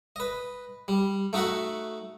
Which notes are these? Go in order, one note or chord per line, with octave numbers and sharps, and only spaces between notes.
B4 D#5
G3
A3 D#4 F#4 E5 F#5